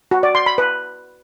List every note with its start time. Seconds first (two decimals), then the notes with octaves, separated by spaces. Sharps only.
0.11 F#4
0.23 D5
0.35 C6
0.46 B5
0.58 B4